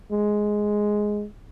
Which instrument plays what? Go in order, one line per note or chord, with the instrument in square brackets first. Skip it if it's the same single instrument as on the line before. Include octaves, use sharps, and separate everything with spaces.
[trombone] G#3